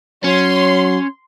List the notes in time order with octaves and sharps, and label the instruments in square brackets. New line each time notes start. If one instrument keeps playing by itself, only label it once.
[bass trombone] F#3 [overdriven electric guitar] C#4 [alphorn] C#5 [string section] C6